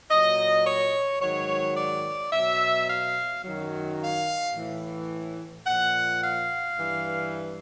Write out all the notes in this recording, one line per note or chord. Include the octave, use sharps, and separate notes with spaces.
A#2 F#3 D#5
C#5
G#2 D#3 F#3 C#5
D5
B2 F#3 E5
F5
F#2 D#3 F#3
F5
A2 E3
A#2 F3 F#5
F5
G2 E3